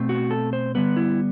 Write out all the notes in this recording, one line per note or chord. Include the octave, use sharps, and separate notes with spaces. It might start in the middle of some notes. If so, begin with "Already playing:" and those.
Already playing: B2 A3 C4
F#4
A4
C5
D3 G3 B3 B4
E4